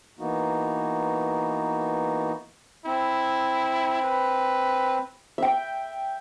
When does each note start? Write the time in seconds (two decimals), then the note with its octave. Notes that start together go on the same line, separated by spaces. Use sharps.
0.19 E3 A#3 B3 D#4 F#4
2.86 C4 E4
4.03 B4
5.38 E5 G5